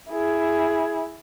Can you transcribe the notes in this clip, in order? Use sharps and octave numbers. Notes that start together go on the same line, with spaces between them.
E4 G#4